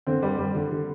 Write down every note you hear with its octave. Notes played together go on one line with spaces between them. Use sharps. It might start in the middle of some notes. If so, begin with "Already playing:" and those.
D3 C4
G3
G3
D3
D3